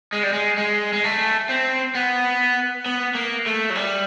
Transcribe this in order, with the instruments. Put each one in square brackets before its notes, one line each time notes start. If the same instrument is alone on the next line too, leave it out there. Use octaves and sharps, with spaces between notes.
[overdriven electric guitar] G#3
G3
G#3
G#3
G#3
A3
C4
B3
B3
A#3
A3
F#3
G3